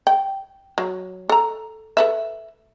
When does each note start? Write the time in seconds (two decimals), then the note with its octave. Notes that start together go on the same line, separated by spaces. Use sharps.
0.07 G5
0.78 F#3
1.29 A4 A#5
1.97 A4 B4 E5